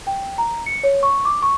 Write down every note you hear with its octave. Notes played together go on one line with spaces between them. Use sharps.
G5
A#5
C#7
C#5
C#6
D6
C#6